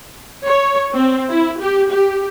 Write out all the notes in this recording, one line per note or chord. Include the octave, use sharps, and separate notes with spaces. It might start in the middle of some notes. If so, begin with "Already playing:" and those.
C#5
C4
E4
G4
G4